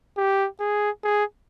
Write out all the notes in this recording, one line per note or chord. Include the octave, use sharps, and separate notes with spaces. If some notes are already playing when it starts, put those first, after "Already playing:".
G4
G#4
G#4